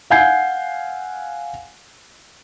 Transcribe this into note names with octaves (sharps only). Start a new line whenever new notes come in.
F5 F#5 G#5 G6 G#6 C7